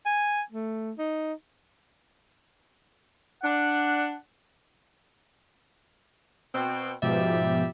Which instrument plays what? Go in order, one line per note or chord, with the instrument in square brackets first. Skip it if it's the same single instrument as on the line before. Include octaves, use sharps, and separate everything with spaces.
[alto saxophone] G#5
A3
D#4
[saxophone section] D4 [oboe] F#5
[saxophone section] B2 C4
[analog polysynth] G#2 B2 F3 [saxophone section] G3 G4 E5